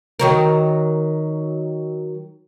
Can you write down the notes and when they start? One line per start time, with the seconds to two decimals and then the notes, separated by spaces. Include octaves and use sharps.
0.20 D#3 F#3 A#4